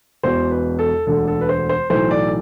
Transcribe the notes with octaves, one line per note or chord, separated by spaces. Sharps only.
E1 E2 B2 C5
B4
A4
E1 D2 D3 A4
A4
B4
C5
C5
B1 A2 E3 C5
D5